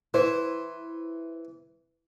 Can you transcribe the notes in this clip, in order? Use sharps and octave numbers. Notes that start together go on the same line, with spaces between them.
E3 E4 C5